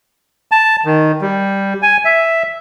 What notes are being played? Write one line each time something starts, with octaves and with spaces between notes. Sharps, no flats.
A5
D#3
G3
G#5
E5